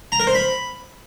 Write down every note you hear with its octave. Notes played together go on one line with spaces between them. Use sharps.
A#5
A#4
C5
B5